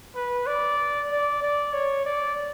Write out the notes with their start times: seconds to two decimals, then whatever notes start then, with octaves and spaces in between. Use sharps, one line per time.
0.15 B4
0.47 D5
1.11 D5
1.42 D5
1.73 C#5
2.06 D5